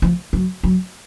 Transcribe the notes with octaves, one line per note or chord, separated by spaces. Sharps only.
F3
F#3
F#3